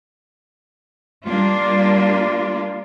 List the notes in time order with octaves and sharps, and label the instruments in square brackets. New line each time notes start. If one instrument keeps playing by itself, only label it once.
[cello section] G3 A#3 D4 F4